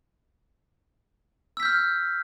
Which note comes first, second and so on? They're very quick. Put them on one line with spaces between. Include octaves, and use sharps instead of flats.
E6 B6 G6 F6